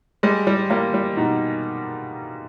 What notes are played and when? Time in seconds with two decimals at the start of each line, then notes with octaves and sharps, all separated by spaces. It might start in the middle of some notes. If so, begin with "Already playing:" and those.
0.23 G3 G#3
0.47 G3
0.70 G3 A#3
0.94 G3
1.17 B2 D#4